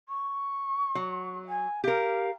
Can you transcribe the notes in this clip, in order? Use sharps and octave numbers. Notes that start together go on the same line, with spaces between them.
C#6
F#3
G#5
G4 A#4 F5